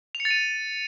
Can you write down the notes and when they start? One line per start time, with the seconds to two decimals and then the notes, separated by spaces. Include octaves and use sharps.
0.15 F7
0.20 C#7
0.25 A6
0.31 D#7